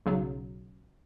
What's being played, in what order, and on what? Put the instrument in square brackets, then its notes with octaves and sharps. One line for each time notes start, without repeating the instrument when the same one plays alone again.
[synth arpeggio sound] B1 C#3 F#3